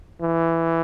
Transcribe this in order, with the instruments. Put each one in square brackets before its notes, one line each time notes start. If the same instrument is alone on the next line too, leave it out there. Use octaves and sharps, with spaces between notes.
[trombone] E3